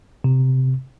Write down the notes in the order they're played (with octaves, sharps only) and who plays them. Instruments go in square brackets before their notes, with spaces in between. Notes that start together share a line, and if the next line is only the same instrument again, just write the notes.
[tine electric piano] C3